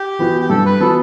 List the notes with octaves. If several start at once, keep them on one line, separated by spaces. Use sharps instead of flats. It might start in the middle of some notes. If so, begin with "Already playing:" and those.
Already playing: G4
E3 B3 F#4
G4
G2 A4
B4
E3 B3 F#4 A4